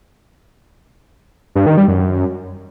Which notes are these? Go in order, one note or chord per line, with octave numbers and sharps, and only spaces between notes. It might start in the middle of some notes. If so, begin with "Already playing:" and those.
G2
D#3
G3
F#2